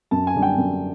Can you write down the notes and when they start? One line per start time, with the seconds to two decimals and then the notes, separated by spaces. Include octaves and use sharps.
0.11 F#2 A5
0.27 G#5
0.35 D3 G3
0.42 G5
0.58 F#2